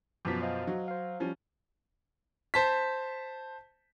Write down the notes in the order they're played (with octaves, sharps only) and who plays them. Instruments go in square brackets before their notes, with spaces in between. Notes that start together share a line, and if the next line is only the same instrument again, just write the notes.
[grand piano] F#2 B2 F3 [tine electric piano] D6 B6
[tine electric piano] C5 D#5 F5
[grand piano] F#3
[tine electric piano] C5 F5
[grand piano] F3 G3 C#4
C5 A5 B6